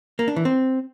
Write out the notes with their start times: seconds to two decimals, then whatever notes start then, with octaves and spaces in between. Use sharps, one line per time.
0.19 A#3
0.28 D4
0.36 E3
0.45 C4